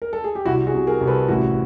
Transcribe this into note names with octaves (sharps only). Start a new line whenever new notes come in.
A#4
A4
G#4
G4
C2 E4 F#4
F#4 G#4
C3
G#4 A#4
C2
A4 B4
A1 E4 F#4